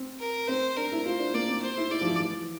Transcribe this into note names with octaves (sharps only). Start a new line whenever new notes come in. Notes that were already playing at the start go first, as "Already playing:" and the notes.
Already playing: C4
A#4
C4 C5
D4 A#4
E4
F4 C5
D4
A#3 D5
C4
C5
E4
E4 D5
F3
E3
E3